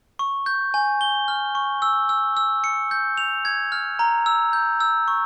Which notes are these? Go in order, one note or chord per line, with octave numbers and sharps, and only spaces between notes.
C#6
G6
G#5
G7
F6
C#6
E6
E6
E6
C#7
G6
F7
G#6
F6
A#5
E6
G6
E6
C#6